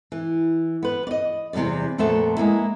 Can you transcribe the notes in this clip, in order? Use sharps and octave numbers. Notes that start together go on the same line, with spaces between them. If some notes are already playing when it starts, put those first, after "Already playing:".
E3
B3 B4
D5 D#5
E2 C3 D#3 G3 D5
F2 A#2 A3 B3 E5 A5
G#3 A#3 B3 E4